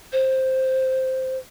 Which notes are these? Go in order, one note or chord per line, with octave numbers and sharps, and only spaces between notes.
C5